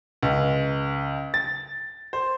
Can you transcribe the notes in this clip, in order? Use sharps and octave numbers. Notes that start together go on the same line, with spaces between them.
C#2
A6
C5